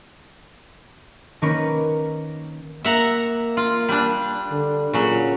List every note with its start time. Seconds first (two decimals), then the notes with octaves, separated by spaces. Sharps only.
1.42 D#3 A#3 C#4 A#4 B4 C#5
2.85 A#3 E5 F#5 A#5
3.57 F4
3.89 G3 D4
4.51 D3
4.93 A#2 C#3 F#3